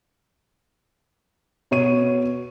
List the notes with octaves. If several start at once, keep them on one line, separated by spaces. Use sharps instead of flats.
B2 C#5 D#7